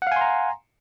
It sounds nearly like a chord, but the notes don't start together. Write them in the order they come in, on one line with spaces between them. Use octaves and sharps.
F#5 F5 G#5 C6 A#5